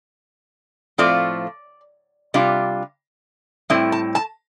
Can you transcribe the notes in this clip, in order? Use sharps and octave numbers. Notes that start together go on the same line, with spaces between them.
A2 F3 A3 C4 F4 D5
C3 G3 D4 F4
A2 G3 C4 E4
A5
A5